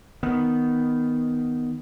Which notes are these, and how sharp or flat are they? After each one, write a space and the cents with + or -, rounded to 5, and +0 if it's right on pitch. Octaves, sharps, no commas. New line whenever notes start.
D#3 +0 B3 +0